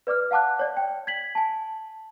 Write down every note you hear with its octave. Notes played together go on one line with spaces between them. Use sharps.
B4 D5 D6 F6
F5 F#5 A5 D6 F#6
C#5 D5
G5
G#6 B6 F#7
G#5 A5